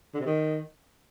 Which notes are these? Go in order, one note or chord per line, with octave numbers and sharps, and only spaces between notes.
D3
C3
D#3